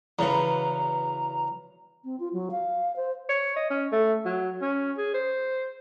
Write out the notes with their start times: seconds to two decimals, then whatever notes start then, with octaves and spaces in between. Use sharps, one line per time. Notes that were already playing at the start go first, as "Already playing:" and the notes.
0.19 E2 C#3 F#4 B4 A#5
2.04 C4
2.20 F4
2.33 F#3
2.51 F5
2.96 C5
3.29 C#5
3.56 D#5
3.70 C#4
3.92 A3
4.25 F#3
4.62 C#4
4.98 G#4
5.14 C5